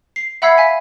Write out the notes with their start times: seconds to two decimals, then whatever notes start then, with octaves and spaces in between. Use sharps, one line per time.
0.16 C7
0.42 E5 F#5 B5 E6 G#6 C7
0.57 F5 G#5 B6